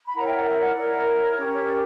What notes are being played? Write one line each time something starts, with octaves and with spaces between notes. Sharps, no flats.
B5
E4 A#4 C#5 F#5 A#5
E5 G5
D5 F#5
C#5 E5
D5 F#5
E4 A#4 C#5
C#5
C#4 G4 A#4
C#5
D5